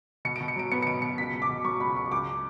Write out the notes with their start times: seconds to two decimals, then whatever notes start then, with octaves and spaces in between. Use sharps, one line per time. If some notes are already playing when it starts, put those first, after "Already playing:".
0.25 B2 C#7
0.36 D7
0.41 B2
0.48 C#7
0.56 F#3 D7
0.72 B3 C#7
0.82 C#7
0.86 B2 D7
1.02 B2 C#7
1.18 C#2 B6
1.33 C#2
1.42 D6
1.49 B2
1.65 F#3 C#6
1.80 C#2 B5
1.96 C#2 C#6
2.12 C#2 D6